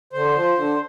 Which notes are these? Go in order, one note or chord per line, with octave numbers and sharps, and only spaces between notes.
D3 C5
F3
D3